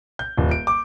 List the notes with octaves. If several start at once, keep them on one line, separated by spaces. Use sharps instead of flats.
G6
D#1
D7
D6